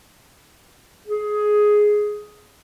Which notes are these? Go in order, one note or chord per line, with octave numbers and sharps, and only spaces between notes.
G#4